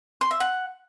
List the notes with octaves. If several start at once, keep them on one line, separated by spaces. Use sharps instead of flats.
C6
E5
F#5